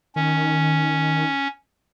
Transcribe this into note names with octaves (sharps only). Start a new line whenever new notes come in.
D#3 C#4